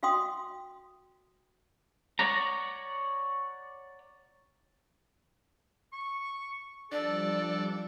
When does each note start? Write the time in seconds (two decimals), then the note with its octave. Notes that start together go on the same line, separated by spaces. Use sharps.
0.03 F#4 F5 G5 C6 D#6
2.19 C#5 D5 F#5 A#5
5.93 C#6
6.92 F3 G3 D4 A4 D5 D6